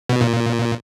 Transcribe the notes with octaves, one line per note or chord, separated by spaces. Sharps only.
B2
A#2